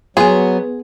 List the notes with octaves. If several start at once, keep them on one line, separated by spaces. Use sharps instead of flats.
F#3 B3 G#4 G#5 C6